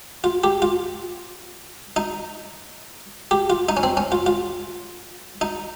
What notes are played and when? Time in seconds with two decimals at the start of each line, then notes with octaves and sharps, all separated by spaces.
0.24 F4
0.44 G4
0.62 F4
1.96 D#4
3.31 G4
3.50 F4
3.69 D#4
3.77 C#4
3.83 C4
3.97 C#4
4.12 F4
4.26 F4
5.41 D#4